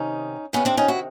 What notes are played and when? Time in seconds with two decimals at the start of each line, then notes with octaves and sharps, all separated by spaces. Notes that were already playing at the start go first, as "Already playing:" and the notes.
Already playing: C3 D#3 C#4 D#4
0.53 C3 D#3 B3 C#4
0.65 C4 D4
0.77 C#4 D#4
0.88 E4 F#4